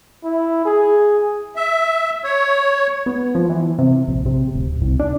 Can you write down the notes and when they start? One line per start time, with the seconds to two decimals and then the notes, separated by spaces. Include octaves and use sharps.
0.24 E4
0.65 G#4
1.56 E5
2.24 C#5
3.06 B3
3.35 F3
3.49 E3
3.79 C3
4.08 A#1
4.26 C3
4.53 D1
4.81 C2
4.99 D4